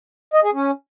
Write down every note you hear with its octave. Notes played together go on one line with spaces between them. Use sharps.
D#5
G#4
C#4